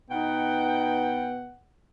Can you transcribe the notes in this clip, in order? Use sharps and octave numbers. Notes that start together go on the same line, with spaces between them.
B2 B3 D#4 F#5 G5